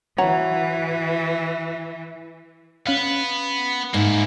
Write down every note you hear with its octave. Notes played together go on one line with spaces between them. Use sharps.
E3 F#4 C#5 A#5
B3 C#4 F5
G#2 A#3 E4